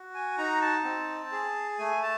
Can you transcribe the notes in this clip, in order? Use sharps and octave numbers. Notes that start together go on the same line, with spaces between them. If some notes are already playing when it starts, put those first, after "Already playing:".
Already playing: F#4
G#5
D#4 A#5
A5
C4
G#4
A3 G#5
A5